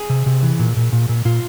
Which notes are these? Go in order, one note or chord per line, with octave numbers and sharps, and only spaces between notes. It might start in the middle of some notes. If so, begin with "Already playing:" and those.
Already playing: G#4
C3
C3
E3
A#2
A#2
A#2
A#2
A#2 F4